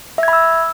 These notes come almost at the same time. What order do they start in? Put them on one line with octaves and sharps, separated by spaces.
E5 G#6 B5 E6